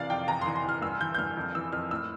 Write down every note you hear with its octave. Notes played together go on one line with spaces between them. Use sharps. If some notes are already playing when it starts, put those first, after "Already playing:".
Already playing: C3 E3 D5 F5
F2 G5
E2 A#5
E3 C6
C6
E2 F6
G2 E6
E3 G6
G6
G2 F6
F2
E3 E6
F2 F6
A2 E6